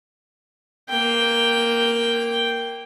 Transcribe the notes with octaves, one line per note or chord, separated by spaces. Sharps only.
A#3 G5